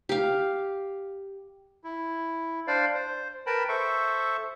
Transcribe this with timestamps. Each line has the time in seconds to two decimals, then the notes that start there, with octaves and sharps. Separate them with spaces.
0.09 G4 F5
1.84 E4
2.67 D4 C5 D5 F5
2.95 C5
3.46 A#4 B4 G5 A5 B5
3.69 A4 C5 E5 C#6